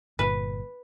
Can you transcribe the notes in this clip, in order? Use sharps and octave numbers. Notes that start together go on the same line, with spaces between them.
G1 A#2 B4